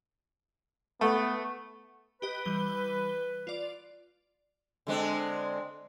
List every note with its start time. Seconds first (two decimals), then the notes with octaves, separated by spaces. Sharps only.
1.01 A3 B3
2.22 G4 B4 D#5
2.45 E3 G3 G7
3.47 F4 D5
4.87 D3 G#3 C4